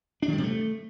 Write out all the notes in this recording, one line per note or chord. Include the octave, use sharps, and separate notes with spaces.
D4
D#3
G3
C3
A3